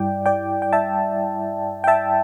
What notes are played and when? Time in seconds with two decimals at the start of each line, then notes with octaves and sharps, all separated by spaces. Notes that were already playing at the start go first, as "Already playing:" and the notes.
Already playing: G2 G3 E4 D5 G5
0.26 D5 G5
0.62 G5
0.73 E5 A5
1.84 G5
1.88 E5 A5